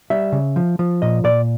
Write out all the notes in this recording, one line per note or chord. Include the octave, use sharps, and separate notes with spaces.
G3 E5
C#3
F3
F3
A#2 D#5
A#2 D5